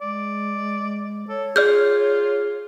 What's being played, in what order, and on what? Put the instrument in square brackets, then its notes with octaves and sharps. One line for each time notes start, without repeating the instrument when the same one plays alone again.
[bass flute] G#3 [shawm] D5
[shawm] A4 [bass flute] C#5
[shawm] F4 [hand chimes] G#4 [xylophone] D5 F6 G6